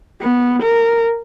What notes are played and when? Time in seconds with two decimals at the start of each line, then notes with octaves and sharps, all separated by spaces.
0.21 B3
0.62 A#4